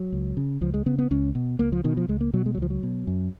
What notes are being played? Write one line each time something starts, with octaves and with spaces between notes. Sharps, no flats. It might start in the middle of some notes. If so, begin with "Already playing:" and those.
Already playing: F#3
C#2
C#3
C#2 F3
G#3
C#3 B3
B3
C#2 C#4
B2
C#2 A#3
F3
B2 D#3
F3
C#2 G#3
A#3
B2 F#3
G#3
F#3
C#2 F3
F#3
B2
F#2